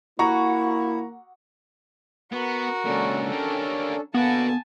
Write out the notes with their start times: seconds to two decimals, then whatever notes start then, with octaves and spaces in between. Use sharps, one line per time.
0.19 A#3 E4 F#4 A#5 C#6
2.32 B3 F#4 A#4
2.85 C#2 A#2 C#4 D4 A4
3.31 A#3 G4
4.14 D3 A#3 B3 F#4 B4 G#5 A5